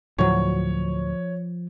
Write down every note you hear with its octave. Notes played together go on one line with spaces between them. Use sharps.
D2 A2 F3 F#3 C#5